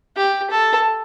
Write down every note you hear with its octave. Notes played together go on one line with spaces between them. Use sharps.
G4
A4